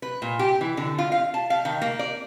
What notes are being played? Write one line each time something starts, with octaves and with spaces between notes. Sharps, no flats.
B4
A#2
G4
E3
D3
F4
F5
A5
F5
D#3
A#3
D5